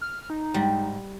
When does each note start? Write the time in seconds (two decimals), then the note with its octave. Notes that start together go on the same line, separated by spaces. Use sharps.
0.01 F6
0.30 D#4
0.54 G#2 G3